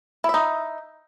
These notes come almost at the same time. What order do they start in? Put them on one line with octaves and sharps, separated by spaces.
E4 E5 D#4